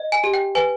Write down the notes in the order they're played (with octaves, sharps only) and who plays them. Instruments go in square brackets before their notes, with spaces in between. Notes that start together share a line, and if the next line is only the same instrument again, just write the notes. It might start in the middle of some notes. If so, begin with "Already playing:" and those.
Already playing: [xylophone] D#5
G#5
G4
G5
B4 G#5